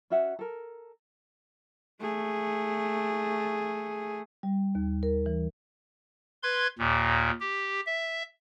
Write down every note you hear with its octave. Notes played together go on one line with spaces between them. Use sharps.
C#4 F#4 E5 F#5
A4 A#4
A3 G#4
G3
D#2
A#4
E3
B4 C6 G#6
D#2 A#2
G4
E5